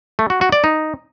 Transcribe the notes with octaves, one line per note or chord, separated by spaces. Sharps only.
A3
F#4
F#4
D5
D#4